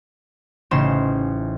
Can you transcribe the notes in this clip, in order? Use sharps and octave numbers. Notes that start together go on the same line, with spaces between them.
A1 C#3 D#4 C5 E7